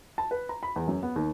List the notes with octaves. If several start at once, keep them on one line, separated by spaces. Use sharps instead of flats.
A5
B4
A#5
B5
E2
F#2
B3
D#2